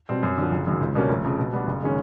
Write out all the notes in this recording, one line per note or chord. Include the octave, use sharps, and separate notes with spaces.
B2 G3 C4
F#2
D3 F3
F#1
F#2 D#3 F#3
C#2
B2 G3 A#3 C#4
F1
F2 C#3
B2
G3 B3 D4 F#4
F#1
D#3 G#3 C#4